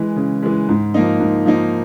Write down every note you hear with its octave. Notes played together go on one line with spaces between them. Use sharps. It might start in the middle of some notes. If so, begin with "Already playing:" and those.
Already playing: E3 G#3
C#3
E3 G#3
G#2
F3 A#3 D#4
G#2
F3 A#3 D#4